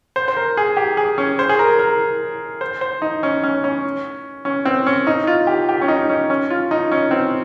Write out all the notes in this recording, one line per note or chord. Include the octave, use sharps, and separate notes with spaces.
C5
C5
A#4
G#4
G4
G#4
C#4
C5
G#4
A#4
A#4
C5
C5
D#4
C#4
C#4
C#4
C#4
C4
C#4
D#4
F4
G4
G4
C#4
D#4
C#4
C#4
F4
D#4
C#4
C4